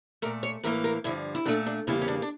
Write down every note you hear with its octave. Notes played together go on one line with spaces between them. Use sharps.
A#2 A3 A#4
C#5
A2 E3 A#3 A#4
A#4
G2 D3 F3 E4
E4
A#2 A3 D4
D4
E2 C#3 G3 A#3 E4
C#4
D4
D4